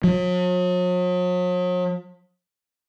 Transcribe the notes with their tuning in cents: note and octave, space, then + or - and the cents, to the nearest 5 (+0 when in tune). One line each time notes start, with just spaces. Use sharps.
F#3 -45